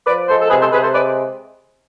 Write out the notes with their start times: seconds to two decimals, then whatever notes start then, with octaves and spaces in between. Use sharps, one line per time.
0.07 F3 B4 D5
0.28 G#3 A4 C5
0.41 A4
0.50 C3 G#4 B4
0.61 A4 C5
0.72 C3 G#4 B4
0.83 A4 C5
0.94 G#3 B4 D5